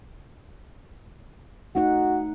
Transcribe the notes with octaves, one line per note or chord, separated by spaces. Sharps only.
A3 D#4 F#4 F#5